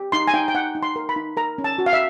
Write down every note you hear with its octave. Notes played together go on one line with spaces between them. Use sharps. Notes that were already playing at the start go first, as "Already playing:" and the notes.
Already playing: G4
D#4 C6
G#5
D#4 G5
G5
D#4 F#5
D#4
C6
A#4
B5
D#4
A#4 A#5
C#4
A5
F#4
F5
E5